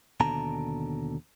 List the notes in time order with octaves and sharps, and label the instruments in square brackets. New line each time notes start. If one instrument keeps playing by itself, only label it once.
[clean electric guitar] D#2 B2 D3 A5 A#5